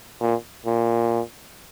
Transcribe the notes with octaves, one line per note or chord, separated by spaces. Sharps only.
A#2
A#2